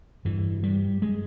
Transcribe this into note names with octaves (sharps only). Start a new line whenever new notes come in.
G2 E3
G3
G#3